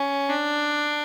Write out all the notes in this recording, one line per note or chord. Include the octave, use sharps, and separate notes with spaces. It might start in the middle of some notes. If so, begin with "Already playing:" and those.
Already playing: C#4
D4